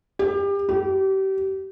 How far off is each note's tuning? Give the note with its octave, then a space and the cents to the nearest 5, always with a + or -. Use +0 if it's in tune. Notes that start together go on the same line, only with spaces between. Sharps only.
G4 +30
G4 -30